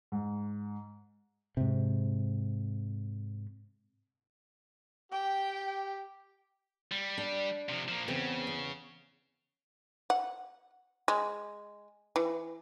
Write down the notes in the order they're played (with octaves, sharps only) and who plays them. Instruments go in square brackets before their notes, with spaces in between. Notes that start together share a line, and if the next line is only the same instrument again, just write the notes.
[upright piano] G#2
[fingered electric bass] G#2 C3
[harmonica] G4 [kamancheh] G5
[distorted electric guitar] G3
[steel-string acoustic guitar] D4
[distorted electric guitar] C3 F3
F3 A#3
[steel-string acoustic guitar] E2 B3 C4 [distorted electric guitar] C#3
[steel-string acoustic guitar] E2
[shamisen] F#5
G#3
E3